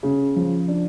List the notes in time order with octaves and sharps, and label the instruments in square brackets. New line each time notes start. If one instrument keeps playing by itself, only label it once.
[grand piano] C#3
F3
D4